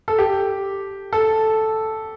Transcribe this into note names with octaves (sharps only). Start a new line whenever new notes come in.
A4
G4
A4